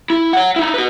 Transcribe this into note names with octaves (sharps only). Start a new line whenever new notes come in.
E4
C#5 F#5
D#4 E4
F#4 B4